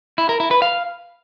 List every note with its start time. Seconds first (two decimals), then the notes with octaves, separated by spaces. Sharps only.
0.18 E4
0.29 A#4
0.40 E4
0.51 B4
0.62 F5